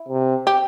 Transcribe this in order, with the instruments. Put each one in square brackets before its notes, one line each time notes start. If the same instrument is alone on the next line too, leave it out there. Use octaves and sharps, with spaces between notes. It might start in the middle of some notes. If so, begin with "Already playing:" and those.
Already playing: [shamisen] E4
[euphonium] C3
[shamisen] G4